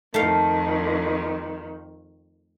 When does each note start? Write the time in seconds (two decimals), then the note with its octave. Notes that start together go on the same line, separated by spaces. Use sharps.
0.14 F2 D#3 A3 F5